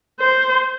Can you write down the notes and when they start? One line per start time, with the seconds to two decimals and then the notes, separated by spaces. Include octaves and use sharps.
0.21 C5